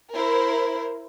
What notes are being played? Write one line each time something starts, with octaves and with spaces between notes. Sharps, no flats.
E4 A#4 C5